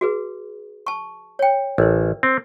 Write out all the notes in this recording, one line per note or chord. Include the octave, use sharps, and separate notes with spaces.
F#4 G#4 B4
A5 C#6
C#5 G5
A1 E4 A#4
C4